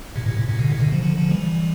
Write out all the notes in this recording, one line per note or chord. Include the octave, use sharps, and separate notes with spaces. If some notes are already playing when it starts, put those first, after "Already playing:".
A2 C3
A2 C3
A2
A2 C3
B2 D3
A2 C3
B2 D3
D3 F3
D3 F3
D3 F3
E3 G3